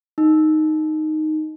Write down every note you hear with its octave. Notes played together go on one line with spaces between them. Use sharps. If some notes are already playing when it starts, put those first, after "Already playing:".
D#4